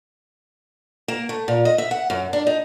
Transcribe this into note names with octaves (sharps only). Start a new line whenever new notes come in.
A#3
A3
A#2
D#5
E5
F#5
F#2
D4
D#4